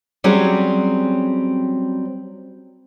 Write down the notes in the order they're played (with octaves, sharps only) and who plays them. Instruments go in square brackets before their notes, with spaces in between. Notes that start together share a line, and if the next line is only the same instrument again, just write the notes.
[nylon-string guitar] F#3 G3 C4 C#4 F#4 G#4